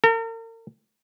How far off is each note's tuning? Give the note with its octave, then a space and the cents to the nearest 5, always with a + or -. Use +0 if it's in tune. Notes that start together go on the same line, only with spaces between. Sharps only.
A#4 -40